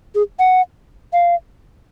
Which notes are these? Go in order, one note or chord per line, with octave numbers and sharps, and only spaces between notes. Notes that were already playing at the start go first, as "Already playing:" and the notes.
G#4
F#5
F5